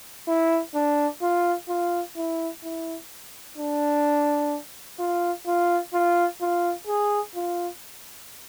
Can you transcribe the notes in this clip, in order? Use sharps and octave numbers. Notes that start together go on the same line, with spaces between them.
E4
D4
F4
F4
E4
E4
D4
F4
F4
F4
F4
G#4
F4